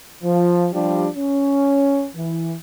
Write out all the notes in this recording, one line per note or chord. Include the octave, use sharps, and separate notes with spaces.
F3
F3 G3 D4 G4
C#4
E3